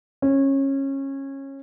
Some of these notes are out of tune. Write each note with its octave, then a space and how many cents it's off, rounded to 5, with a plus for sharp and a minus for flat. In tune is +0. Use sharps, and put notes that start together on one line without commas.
C#4 -20